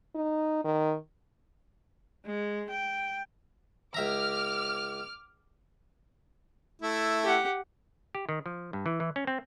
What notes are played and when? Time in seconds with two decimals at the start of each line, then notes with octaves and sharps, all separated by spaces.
0.15 D#4
0.64 D#3
2.27 G#3
2.70 G5
3.94 C#2 E5 A#5 D6 F6
6.82 A3 E4
7.23 G4 F#5
8.15 G4
8.29 D#3
8.46 F3
8.73 G2
8.86 E3
9.00 E3
9.16 C#4
9.27 C4